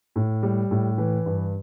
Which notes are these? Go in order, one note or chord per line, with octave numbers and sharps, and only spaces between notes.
A2
G3
A2
E3
G2